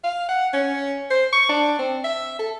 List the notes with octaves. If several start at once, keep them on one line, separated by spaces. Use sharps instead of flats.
F5
F#5
C#4
C5
C#6
D4
C4
E5
A4